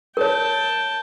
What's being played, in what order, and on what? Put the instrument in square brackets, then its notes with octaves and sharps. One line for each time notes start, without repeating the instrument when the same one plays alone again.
[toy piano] A#4 C#5 [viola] G5 A5